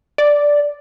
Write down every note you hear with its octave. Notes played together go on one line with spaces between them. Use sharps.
D5